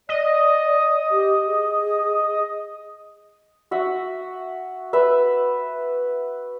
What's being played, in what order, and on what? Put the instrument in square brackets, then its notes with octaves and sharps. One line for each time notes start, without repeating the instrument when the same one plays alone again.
[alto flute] D5 [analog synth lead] D#5
[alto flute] G4
G#4
[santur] F#4 E5 F#5
B4 E5